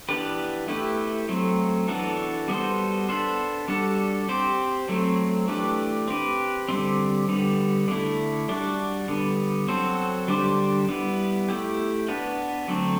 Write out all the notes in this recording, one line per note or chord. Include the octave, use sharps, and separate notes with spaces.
E3 B3 D4 G4 B4
A3 E4 G4 B4
F#3 A3 C4
E3 B3 D4 F#4 A4
G3 B3 F#4 A4 C5
B3 D4 A4 C5
G3 D4 F#4 A4
C4 G4 C5
F#3 A3 C4
E3 A3 D4 G4 B4
C4 G4 B4
D3 G3 C4
D3 G3 B3
D3 A3 E4
G3 D4 F#4
D3 G3 B3
F#3 C4 F#4 A4 C5
D3 G3 D4 G4 C5
G3 B3 E4
A3 E4 G4
B3 D4 F#4 B4
D3 F#3 A3 C4